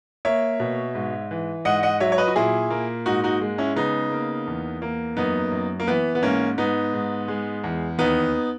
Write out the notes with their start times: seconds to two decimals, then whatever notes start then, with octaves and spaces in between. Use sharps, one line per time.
0.25 A#3 C#5 E5
0.60 B2
0.95 G#2
1.31 E3
1.65 G#2 D#5 F#5
1.83 D#5 F#5
2.00 F#3 C#5 E5
2.12 C#5
2.18 B4 D#5
2.28 F#4
2.36 A#2 E4 G#4
2.70 A#3
3.06 G#2 D#4 F#4
3.24 D#4 F#4
3.41 G#3
3.58 C#4 E4
3.76 C#3 B3 D#4
4.12 A#3
4.47 E2
4.82 A#3
5.17 F#2 B3 D#4
5.52 F#2
5.80 A#3
5.88 E3 B3
6.15 B3
6.23 G#2 A#3 C#4
6.58 G#2 B3 D#4
6.93 G#2
7.28 G#3
7.64 E2
7.98 D#2 B3 D#4